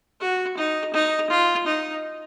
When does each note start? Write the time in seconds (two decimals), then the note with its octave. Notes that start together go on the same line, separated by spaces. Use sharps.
0.20 F#4
0.57 D#4
0.93 D#4
1.30 F4
1.67 D#4